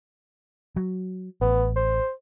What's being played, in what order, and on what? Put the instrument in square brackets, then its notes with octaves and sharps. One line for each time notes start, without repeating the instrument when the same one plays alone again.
[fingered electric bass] F#3
[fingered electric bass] A1 [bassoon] B3
[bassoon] C5